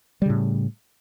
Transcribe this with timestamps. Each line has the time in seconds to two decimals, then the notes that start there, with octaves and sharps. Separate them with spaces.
0.22 G3
0.26 C#3
0.30 A2